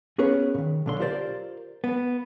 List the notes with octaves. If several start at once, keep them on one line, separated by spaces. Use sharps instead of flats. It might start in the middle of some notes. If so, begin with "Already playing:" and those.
B3 C#4 G#4 A#4 B4 C#5
A#2 D#3
B1 D3 C6
F4 G4 A#4 C5 D5
B3